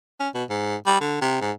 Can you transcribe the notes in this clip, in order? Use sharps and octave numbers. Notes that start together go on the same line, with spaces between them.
C#4
B2
G#2
G3
D3
C3
G#2